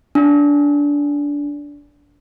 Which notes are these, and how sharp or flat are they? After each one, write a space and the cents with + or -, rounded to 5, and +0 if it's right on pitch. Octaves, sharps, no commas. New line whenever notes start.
D4 -20